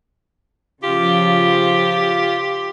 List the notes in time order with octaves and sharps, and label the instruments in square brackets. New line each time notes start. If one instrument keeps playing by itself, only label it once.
[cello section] C#3 F3 [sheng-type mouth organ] F4 [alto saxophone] G4